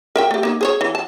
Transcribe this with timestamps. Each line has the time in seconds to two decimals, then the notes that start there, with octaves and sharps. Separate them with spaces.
0.16 A#4 E5 G5
0.31 A3 G4
0.43 A#3 D#4
0.61 G#4 C5 C#5
0.81 E3
0.95 A5